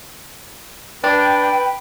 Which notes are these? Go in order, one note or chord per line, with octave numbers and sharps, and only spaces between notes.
D4 B4 G5